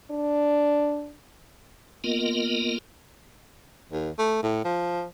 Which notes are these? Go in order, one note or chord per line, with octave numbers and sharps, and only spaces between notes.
D4
A#3 B3 F4 A#4 D#5
D#2
A3
A2
F3